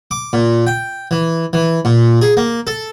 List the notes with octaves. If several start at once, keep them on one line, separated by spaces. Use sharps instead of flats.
D6
A#2
G5
E3
E3
A#2
G#4
A#3
A4